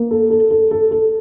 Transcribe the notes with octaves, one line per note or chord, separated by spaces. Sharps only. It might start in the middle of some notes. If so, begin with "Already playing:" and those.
Already playing: A#3
A4
A4
A4
A4
A4